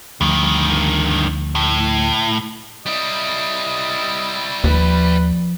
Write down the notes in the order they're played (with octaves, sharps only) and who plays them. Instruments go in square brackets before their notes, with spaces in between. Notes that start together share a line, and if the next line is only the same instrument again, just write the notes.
[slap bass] D2 F3 A3 [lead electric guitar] G2 D#3
[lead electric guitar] A2
[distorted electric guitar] G3 E4 [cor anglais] D#5
[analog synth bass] D#2 [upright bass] F3 [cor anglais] B4